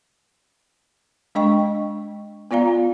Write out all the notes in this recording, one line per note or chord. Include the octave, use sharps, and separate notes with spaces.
G#3 D4 D#5 G5 C#6
B3 F4 D5 F5 A#5